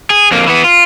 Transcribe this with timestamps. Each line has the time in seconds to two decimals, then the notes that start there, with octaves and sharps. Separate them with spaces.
0.10 G#4
0.31 F2 A#3
0.48 E3 B3
0.64 F4